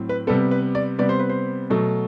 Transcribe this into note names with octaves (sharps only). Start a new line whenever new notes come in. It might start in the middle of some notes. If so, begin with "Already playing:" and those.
Already playing: A2 F#3 C4
B4
C3 G3 B3 A4
B4
D5
C3 G3 B3 D5
C5
B4
C5
B2 F#3 A3